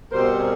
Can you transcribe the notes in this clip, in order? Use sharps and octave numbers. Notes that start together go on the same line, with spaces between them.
B2 G3 C4 A#4 C5
G#4 A#4